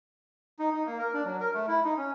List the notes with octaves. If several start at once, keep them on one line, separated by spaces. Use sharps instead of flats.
D#4
D#4
A#3
A#4
D4
F#3
A#4
A3
E4
D#4
C#4